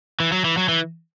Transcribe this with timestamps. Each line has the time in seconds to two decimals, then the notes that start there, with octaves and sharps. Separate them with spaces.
0.20 E3
0.32 F#3
0.45 E3
0.57 F#3
0.69 E3